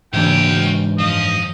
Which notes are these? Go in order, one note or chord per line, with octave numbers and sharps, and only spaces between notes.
G#2 C#3 E3 A#3 D4 F#4 E5 G5
G#3
F#2 F3 D#5